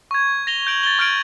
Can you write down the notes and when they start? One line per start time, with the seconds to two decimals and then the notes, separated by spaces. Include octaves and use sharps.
0.11 C#6 G#6
0.47 A#6 F7 G7
0.67 G6 D7 F#7
0.83 A6 G7
0.99 C#6 F6 G6 G#6 D7 F#7